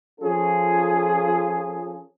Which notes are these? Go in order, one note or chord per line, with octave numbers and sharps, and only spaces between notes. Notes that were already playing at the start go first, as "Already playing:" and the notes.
F3 C#4 F4 G#4 A4